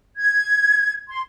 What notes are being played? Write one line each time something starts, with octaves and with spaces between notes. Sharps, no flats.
G#6
C6